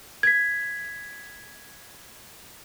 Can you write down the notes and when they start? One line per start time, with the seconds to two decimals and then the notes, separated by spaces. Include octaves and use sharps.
0.23 G#6 B6